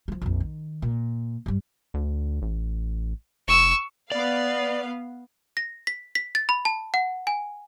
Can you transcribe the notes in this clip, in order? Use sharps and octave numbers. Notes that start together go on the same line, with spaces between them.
F3 G#3
A#1 F2
D#3
A#2
G2 G3
D2
A1
F1 C#6 E6
B3 D5 F5
A#6
B6
B6
A6
B5
A5
F#5
G#5